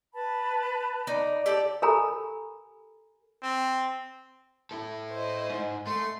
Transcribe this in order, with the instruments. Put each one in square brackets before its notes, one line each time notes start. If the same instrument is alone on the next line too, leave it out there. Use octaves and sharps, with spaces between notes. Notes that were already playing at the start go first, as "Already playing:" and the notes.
[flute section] B4 A5 B5
[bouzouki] D#4 D5
G4 A4 D5
[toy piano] G4 A4 A#4 G#5 A#5 B5
[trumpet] C4
[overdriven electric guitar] E4 A4
[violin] C5 D#5
[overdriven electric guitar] G#2
[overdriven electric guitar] A3 [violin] C6